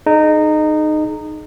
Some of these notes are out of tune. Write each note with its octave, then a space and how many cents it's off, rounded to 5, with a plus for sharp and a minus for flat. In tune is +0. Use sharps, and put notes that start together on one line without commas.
D#4 -20 G#4 +35